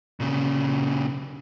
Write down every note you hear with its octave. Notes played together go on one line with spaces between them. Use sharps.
A#2 C#3